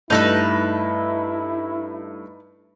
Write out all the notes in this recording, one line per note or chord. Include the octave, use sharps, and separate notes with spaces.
G2 A3 D#4 E4 A4 B4 A#6